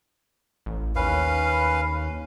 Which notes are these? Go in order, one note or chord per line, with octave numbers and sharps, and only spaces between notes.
A1
D#2 C#4 B4 F5